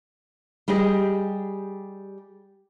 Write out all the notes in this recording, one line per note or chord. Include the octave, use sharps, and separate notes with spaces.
G3 G4 G#4 D#5